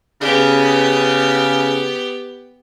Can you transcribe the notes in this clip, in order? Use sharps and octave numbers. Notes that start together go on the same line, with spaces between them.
C#3 B3 G4